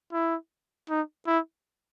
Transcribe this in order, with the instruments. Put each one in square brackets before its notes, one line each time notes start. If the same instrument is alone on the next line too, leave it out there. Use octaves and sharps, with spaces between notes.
[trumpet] E4
D#4
E4